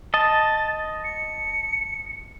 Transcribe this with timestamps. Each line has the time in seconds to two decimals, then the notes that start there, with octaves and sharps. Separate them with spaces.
0.14 D#5 A5 A6
1.04 C#7